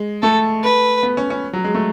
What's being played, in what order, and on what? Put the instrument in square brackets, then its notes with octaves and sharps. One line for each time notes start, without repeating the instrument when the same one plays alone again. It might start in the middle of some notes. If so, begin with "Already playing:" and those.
Already playing: [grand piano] G#3
[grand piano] A3 [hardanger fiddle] A4
[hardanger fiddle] B4
[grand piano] B3
C#4
C#4
F#3
G#3
A3